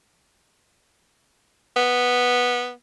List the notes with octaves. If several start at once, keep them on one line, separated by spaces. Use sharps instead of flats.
B3